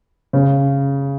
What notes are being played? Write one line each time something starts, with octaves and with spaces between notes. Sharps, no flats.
C#3